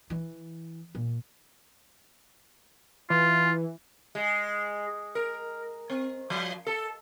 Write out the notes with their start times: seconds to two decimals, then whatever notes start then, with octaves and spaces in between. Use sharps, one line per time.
0.10 E3
0.95 A#2
3.10 E3 F4
4.15 G#3
5.15 A#4
5.90 C4
6.30 F3
6.67 A4